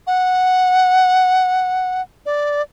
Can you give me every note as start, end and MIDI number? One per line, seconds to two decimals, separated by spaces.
0.07 2.02 78
2.26 2.62 74